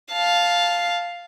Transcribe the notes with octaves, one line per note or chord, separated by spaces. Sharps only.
F5 A5